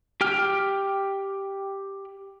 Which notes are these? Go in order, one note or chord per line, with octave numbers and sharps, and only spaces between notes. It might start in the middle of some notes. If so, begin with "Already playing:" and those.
G4 G5 F6